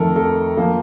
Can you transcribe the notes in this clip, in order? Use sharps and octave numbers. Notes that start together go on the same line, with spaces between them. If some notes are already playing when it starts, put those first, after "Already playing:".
Already playing: F2 D#3 A3 A4 A#4
A4
F3 A#3